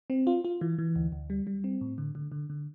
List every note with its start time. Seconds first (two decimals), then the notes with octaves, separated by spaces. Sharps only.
0.10 C4
0.27 F4
0.44 F4
0.61 E3
0.78 E3
0.96 D2
1.12 D2
1.30 G3
1.47 G3
1.64 C4
1.81 A2
1.98 D3
2.15 D3
2.32 D3
2.50 D3